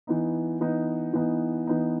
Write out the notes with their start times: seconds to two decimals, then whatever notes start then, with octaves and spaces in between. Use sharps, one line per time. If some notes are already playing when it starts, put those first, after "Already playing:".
0.07 E3 B3 D#4
0.61 E3 B3 D#4
1.13 E3 B3 D#4
1.67 E3 B3 D#4